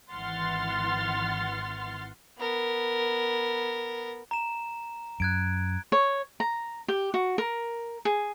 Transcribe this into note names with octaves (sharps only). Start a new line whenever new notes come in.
G#1 E3 F#5 C6 F6 A6
B3 A#4
A#5 E7
F#2 F#6 G#6 D7
C#5
A#5
G4
F#4
A#4
G#4